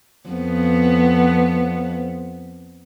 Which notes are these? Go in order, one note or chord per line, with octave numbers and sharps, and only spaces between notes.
F2 B3